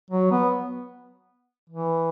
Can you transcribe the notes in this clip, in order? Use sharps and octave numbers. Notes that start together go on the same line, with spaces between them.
F#3
B3
E3